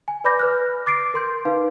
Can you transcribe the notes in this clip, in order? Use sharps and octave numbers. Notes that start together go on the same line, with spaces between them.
G#5
B4 D5 B5 D6 G6 A#6
B4 F6 F#6
D6 A6 C7 D7
A#4 C6 G6
D#4 B4 F5